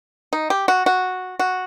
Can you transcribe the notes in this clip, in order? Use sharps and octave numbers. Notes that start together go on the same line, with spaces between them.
D#4
G4
F#4
F#4
F#4